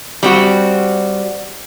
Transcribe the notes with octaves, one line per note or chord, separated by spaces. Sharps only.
G3 C4 F#4